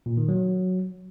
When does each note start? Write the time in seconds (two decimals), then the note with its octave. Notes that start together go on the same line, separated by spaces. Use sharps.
0.06 A#2
0.17 D#3
0.28 F#3